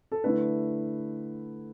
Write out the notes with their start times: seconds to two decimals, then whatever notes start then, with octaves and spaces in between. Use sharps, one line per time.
0.12 A4
0.24 D3 A3 E4 B4